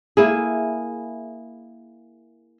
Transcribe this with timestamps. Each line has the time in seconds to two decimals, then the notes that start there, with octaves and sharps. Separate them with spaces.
0.17 A#3 E4 G#4